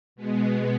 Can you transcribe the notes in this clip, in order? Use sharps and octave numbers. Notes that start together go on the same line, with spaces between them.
B2 G#3 B3